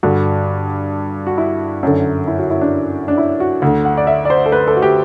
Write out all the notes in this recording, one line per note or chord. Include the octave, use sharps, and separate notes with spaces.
G2 D3 F#4
F#4
E4
F#2 D3
E4
F#4
E4
D4
D4
E4
F#4
D2 D3
F#5
D5
E5
D5
C5
A4
B4
A4
F#4
G4